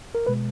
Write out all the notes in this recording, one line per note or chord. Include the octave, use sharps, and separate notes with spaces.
A#4
B2 G#3 B4